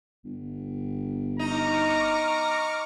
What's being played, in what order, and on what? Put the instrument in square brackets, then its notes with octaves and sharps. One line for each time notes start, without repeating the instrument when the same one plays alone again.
[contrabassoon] G1
[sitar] D#4 [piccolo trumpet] A#5 [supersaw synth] C#6 D6 F6